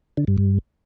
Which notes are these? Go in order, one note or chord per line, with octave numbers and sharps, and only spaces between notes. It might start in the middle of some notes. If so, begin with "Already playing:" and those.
D3
G2
G2